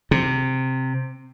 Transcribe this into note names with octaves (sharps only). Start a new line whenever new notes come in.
C3